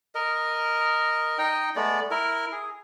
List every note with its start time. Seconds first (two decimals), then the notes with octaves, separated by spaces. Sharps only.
0.15 A#4 D#5
1.38 D#4 D#5 G5
1.76 G#3 A3 B3 D5
2.11 E4 A#4
2.52 G#4